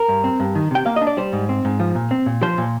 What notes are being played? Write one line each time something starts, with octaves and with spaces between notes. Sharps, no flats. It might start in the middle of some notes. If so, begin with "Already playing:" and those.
Already playing: A#4
G2
C4
G2
D#3
C3 G5
A#3 F5
D4 D#5
D5
G3 C5
G#2
C4
G#2
F3
A#2
C4
A#2
F3 C5
A#2